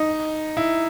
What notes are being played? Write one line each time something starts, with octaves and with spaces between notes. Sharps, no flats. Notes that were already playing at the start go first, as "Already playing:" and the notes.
Already playing: D#4
E4